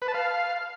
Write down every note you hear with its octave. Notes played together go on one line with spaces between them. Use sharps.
B4
A5
F5